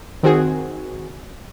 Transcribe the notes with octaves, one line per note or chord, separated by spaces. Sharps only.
D#3 C4 F#4 G#4